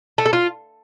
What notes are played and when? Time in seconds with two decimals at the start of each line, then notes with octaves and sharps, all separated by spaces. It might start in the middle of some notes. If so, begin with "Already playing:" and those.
0.18 A3
0.26 A4
0.33 F4